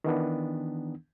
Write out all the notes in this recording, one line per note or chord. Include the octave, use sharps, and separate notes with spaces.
D#3 E3 B3 D4